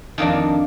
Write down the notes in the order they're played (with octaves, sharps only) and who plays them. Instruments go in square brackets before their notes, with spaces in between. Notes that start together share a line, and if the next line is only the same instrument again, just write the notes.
[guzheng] F2 D#3 A#3 D4